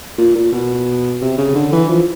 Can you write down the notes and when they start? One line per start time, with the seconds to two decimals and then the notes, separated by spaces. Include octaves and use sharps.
0.18 A#2
0.35 A#2
0.53 B2
1.22 C3
1.38 C#3
1.55 D3
1.73 E3
1.89 F3